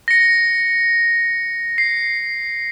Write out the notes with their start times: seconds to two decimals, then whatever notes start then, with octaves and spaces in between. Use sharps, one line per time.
0.08 A#6 C#7
1.78 C7